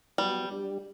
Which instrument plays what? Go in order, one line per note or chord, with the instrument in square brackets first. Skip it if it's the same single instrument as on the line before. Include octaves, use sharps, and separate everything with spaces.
[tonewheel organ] F#3 B3 F#4 [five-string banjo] G3
[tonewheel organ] G3 D4 G4